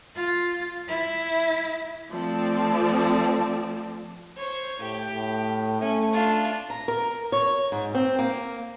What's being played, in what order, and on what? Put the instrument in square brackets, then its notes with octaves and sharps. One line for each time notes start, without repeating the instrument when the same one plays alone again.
[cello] F4
E4
[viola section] F3 A3 C4 F4 D5 A5
[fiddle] C5 C#5
[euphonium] A2 [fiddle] G4
[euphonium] A2
[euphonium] A3 [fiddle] C#4
[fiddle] D4 F4
[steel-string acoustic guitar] A#5
A#4
C#5
G#2
C4
A#3